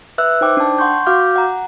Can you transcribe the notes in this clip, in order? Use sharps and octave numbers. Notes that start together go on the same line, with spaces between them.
B4 E5 E6 F#6
D#4 C5 G5 D6
D4 G5 A5
F#5 C6 C#6 G6
F#4 F5 D6 F6 G6
F#5 A#5